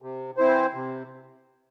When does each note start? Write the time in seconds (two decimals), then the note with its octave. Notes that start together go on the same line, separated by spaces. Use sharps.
0.02 C3
0.37 E3 C4 E4 C5
0.74 C3